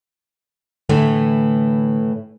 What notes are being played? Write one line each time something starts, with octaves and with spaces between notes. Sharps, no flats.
A2 D3 E3 A3